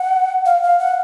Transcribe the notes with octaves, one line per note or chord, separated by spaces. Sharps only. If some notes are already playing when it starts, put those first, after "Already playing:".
Already playing: F#5
F5
F5
F#5